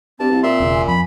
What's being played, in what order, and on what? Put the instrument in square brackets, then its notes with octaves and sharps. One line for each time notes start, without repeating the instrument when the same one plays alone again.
[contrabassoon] G2 [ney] C4 [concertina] A5
[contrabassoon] C2
[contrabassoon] A#2 [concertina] E5 C6
[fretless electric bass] E1 C#3
[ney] G#5
[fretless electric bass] F2 [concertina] B5